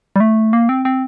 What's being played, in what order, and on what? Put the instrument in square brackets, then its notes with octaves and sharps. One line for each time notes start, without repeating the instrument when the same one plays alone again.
[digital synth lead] G3
A3
A#3
C4
C4